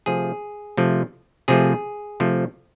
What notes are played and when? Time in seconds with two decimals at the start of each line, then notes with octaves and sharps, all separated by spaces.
0.06 C3 F3 A3 G#4
0.77 C3 F3 A3
1.48 C3 F3 A3 G#4
2.20 C3 F3 A3